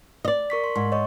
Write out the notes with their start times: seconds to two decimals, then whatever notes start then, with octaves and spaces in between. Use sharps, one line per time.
0.25 D5 D#5
0.50 A#4 C#6 B6
0.64 C6
0.76 G#2 C6
0.92 C#5 D#5 C#6